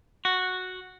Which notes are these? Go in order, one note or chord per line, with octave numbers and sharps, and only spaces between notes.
F#4